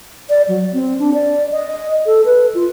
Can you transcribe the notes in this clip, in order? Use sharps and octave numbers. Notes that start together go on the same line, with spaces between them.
D5
F#3
C4
D4
D5
D#5
A4
B4
F4